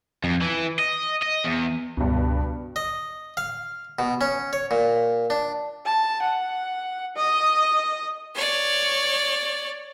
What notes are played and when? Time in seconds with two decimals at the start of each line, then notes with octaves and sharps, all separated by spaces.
0.24 F2
0.42 E3
0.79 D#5
1.22 D#5
1.44 E2
1.97 C#2 G2 B2
2.76 D#5
3.37 F5
3.99 B2
4.21 C#4
4.53 C#5
4.71 A#2
5.30 D4
5.86 A5
6.22 F#5
7.16 D#5
8.35 C#5 D5